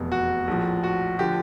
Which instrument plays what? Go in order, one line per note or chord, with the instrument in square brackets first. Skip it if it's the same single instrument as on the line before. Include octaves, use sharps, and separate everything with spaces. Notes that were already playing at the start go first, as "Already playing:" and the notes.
Already playing: [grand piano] F1 E2 B2
F#4
A#1 A2 F3
F#4
D3 F3 G4